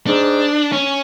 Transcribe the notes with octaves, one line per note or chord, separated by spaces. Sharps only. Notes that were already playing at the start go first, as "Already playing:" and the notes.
G#2 D4
C#4